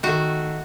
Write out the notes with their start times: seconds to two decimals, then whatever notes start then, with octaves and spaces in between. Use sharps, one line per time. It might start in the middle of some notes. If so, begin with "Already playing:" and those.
0.03 D#3 A3 F#4